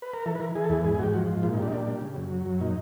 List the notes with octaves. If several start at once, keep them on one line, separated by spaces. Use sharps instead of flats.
B4
A#4
E3 A4
B4
E3 A#4
E3 G#4
A4
E2 G#4
G#2 G#4
G#4
G#2 F#4 G4
F3 F#4
G#2
A#2 F4
D#4
G3 D4
D#4
A#2 D4
G3
C#3
F#2
F#3
F#2
A#2 D#4